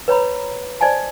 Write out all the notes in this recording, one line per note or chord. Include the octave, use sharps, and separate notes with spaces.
B4 C#5 A#5 B5
C5 D5 D#5 G#5 A5